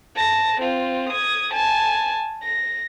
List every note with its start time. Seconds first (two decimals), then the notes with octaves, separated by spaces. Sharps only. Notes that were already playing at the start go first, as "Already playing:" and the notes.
0.16 A5 A#6
0.60 C4 F4
1.09 D#6 G#6
1.53 G#5 A5
2.43 A#6